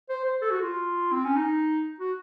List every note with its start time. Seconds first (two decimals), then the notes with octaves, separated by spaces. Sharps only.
0.09 C5
0.25 C5
0.41 A4
0.51 F#4
0.62 F4
1.12 C4
1.25 C#4
1.36 D#4
2.00 F#4